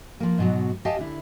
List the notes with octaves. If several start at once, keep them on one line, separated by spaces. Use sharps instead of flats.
F3 A#3
G#2 B2 F#3
G4 D#5 F5 G#5 A5
D3 E4